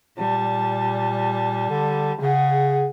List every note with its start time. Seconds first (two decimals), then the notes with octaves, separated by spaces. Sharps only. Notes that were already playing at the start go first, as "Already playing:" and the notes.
0.18 A#2 G3 A5
1.70 D3
2.21 C#3 G#4 F#5